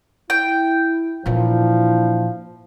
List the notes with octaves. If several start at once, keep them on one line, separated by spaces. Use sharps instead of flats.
E4 G5
A#2 E3 F3 D4 E4